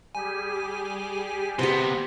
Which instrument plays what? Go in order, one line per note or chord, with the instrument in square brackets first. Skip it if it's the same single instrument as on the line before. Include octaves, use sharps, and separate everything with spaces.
[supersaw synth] G3 G4 G#4 [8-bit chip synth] G#5
[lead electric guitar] C3 B3 [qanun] G4 C5